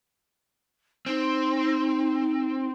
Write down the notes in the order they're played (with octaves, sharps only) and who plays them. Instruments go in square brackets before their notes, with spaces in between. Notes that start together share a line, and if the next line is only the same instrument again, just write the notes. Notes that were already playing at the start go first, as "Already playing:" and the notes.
[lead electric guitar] C4 [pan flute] D#4